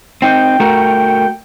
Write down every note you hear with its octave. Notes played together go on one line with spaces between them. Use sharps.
C4 D#4 G5
A3 F#4 A#4